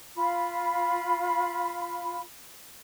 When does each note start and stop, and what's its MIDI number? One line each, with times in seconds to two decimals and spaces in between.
0.17 2.21 65
0.17 2.21 83